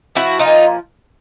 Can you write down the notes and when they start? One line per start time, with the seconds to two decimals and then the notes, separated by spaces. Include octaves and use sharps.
0.15 F3 E4 F#4
0.39 D#4 F4
0.47 A#2